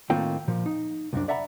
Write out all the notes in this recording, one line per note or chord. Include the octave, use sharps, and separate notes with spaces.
A2 D#3 A#3 C4 F4 G5
A#2 F3
D#4
C2 F#2 D4
D5 E5 F#5 A#5 B5